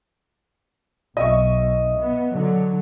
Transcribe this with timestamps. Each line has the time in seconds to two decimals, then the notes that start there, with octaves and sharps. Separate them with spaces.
1.17 B1 D#5 E5 C#6
1.99 B3
2.33 D3 F#3